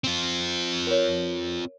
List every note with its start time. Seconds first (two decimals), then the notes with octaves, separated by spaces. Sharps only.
0.04 C4 F4
0.87 A#4 C#5